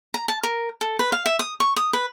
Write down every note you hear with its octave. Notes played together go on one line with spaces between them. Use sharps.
A#5
A5
A#4
A4
B4
F5
E5
D#6
C#6
D#6
B4